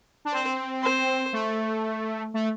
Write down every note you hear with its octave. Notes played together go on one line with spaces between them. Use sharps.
D4
C4 C5
C5
A3
A3